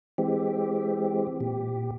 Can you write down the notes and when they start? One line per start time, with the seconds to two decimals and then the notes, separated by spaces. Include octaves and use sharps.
0.18 E3 G#3 C4 G4
1.40 A#2 G4